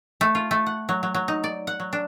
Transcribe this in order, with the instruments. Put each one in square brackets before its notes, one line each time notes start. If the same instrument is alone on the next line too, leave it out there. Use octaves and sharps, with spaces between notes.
[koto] A3
F4
A3
F#5
F#3
F#3
F#3
D#4
D5
F#5
F#3
D4